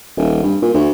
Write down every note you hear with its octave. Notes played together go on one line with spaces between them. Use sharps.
D#1
G2
A#2
D2